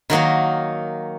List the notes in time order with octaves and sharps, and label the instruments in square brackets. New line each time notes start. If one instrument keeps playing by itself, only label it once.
[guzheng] D#3 F#3 A#3 D#4 F#4